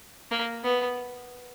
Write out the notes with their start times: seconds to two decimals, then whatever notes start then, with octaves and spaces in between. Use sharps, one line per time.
0.31 A#3
0.64 B3